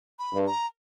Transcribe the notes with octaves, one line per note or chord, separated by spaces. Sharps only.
B5
G2
A#5